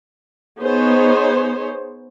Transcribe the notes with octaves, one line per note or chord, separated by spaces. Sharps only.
B3 D#4 G#4 C5 C#5